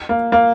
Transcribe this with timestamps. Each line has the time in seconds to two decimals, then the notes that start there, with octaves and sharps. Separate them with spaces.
0.09 A#3
0.32 A#3